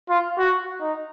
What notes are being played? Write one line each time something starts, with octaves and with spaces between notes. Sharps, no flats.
F4
F#4
D#4